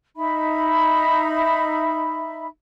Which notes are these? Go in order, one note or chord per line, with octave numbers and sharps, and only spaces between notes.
D#4 E5 B5